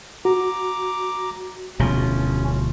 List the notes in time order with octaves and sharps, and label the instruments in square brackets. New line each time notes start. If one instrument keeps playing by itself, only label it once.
[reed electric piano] F#4 [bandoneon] A#5 D6
[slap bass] D1 B2 F3 [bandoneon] C#4